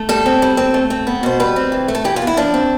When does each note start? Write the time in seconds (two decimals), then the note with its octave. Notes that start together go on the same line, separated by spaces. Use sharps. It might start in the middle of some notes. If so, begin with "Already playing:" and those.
Already playing: A3
0.09 G3 A4
0.26 C4
0.42 G3
0.57 C4
0.74 A3
0.90 C4
1.07 B3
1.23 B2 C5
1.40 G3 B4
1.56 C4
1.72 E3
1.88 A3
1.95 A4
2.04 E3 G4
2.16 F4
2.22 B3
2.27 E4
2.37 F3 D4
2.54 C4